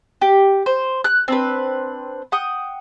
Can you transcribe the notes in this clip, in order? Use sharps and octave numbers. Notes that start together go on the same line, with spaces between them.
G4
C5
F#6
C4 D4 B4
F#5 G5 D#6